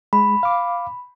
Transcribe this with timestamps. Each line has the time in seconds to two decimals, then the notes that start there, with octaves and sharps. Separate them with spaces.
0.13 G#3 B5
0.43 F5 D6